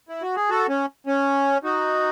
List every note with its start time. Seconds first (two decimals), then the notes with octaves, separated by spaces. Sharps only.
0.09 E4
0.22 F#4
0.36 G#4
0.50 F#4 A4
0.69 C#4
1.07 C#4
1.64 D#4 F#4